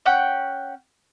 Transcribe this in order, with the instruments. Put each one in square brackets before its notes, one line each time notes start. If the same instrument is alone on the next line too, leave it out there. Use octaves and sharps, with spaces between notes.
[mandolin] C#4 F#5 G5